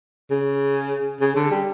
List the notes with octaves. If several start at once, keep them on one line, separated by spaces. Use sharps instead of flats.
C#3
C#3
D3
G3